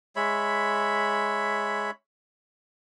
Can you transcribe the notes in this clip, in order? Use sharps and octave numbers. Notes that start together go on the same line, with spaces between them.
G#3 C#5 E5 B5